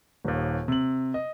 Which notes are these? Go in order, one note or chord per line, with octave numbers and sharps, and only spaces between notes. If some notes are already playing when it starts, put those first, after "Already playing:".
D#1 D#2
C3 F#7
D#5